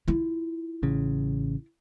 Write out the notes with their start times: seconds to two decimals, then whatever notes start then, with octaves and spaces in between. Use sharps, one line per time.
0.08 E4 F4
0.83 A1 C#3